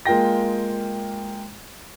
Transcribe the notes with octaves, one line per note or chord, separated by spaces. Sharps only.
G#3 A#3 F4 G5 A#6